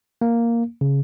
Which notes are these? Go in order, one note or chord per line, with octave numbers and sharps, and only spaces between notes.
A#3
C#3